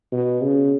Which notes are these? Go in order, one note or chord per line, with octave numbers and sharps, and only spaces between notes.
B2
C#3